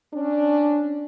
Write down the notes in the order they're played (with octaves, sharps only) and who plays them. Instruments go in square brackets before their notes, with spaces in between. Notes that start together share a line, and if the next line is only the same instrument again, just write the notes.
[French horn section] C#4 D4